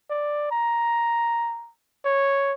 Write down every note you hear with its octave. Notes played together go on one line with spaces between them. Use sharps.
D5
A#5
C#5